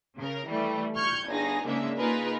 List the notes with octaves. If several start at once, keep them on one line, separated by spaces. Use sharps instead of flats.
C#3 A#4
E3 G3 A3
C#6 F6 G6 G#6 C#7
G1 D#4 G#4 G#5 A#6
G#2 C#3 G#3 A#3 D4 E5
A#3 D#4 F4 G#4 A#4 B4